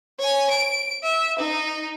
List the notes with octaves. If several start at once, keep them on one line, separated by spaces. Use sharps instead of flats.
C#5 G#5
D7
E5
D#4